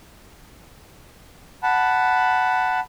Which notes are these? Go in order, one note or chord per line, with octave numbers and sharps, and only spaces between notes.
F#5 A5 B5